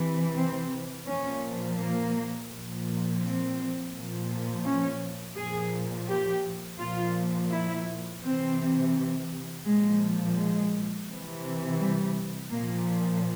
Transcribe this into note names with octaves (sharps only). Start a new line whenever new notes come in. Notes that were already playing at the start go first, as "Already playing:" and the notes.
Already playing: C3 E3
C4
A#2 F3 C#4
A#3
A#2
F3
C4
A#2 F3
C#4
A#2 F3 G#4
G4
A#2 F3 F4
E4
C3 E3 C4
A#2 F3 G#3
G#3
C3 E3
G3
A#2 A#3
F3